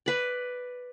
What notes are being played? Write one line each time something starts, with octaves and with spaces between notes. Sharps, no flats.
B4 D5